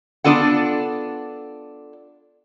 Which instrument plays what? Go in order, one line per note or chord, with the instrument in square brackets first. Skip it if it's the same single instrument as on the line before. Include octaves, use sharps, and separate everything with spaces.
[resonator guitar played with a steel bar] B3 D4 F4 A4 F#5